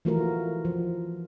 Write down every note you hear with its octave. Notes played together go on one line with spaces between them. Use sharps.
E3 F3 A3 F4 F#4 A#4
F3